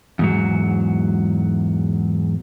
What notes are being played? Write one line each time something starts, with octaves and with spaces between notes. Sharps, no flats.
E2 G#2 F#3